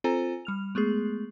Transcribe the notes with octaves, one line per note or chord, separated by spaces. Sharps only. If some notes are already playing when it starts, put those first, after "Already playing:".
C4 F4 A4 C5 G#5 A#5
G3 F6 F7
G#3 A3 B3 G#4